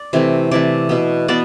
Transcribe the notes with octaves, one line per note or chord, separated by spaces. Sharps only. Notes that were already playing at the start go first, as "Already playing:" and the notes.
Already playing: D5
C3 E3 A3
C3 E3 A3 D5
B2 B3
B2 B3 D5